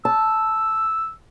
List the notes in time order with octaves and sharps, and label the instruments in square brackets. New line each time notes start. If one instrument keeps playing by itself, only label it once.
[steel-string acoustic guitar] A5 [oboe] E6